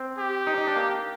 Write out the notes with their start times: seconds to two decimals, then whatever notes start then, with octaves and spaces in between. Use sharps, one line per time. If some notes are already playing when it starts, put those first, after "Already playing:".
Already playing: C4
0.18 G4
0.47 D#4
0.58 D#4
0.67 D4
0.76 A#3